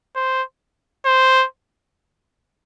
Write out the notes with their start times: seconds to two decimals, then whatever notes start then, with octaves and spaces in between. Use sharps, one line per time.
0.15 C5
1.05 C5